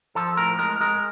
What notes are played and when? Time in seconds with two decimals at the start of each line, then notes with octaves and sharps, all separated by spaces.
0.15 F3 A4
0.37 A2 A#4
0.59 G#3 A#4
0.81 G#3 A#4